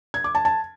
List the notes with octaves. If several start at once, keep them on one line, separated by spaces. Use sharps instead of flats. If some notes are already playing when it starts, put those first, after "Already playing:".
G#6
D6
A5
A5